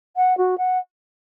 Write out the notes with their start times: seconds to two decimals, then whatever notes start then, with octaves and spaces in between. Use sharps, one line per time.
0.16 F#5
0.38 F#4
0.58 F#5